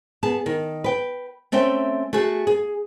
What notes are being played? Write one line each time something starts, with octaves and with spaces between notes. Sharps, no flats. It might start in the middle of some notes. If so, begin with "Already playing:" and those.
B3 G#4 A5
D#3
B4 G5
A3 C4 C#4 E5 G5
A3 F#4 G#4
G#4